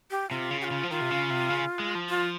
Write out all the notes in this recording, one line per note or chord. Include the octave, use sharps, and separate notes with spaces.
G4
C3 F4
C#3
G4
F4
C#3
F3
D#3 F4
C3
C#3
C3
C#3
G#3
F3
F4